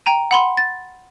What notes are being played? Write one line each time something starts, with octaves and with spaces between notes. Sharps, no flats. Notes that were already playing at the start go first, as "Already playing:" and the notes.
G5 A#5 D#7
F#5 B5 C6
A6